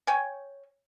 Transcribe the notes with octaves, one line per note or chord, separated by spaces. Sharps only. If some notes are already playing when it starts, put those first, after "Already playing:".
C#5 G5 G#5